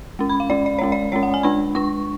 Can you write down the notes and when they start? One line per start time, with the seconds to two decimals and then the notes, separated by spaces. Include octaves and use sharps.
0.19 G#3 C#4
0.29 B5
0.40 F5
0.50 G#3 C#4 D5
0.66 D5
0.79 G#3 C#4 C#5
0.92 D5
1.12 G#3 C#4 C#5
1.23 F#5
1.34 G#5
1.43 G#3 D4 B5
1.75 G#3 D4 C#6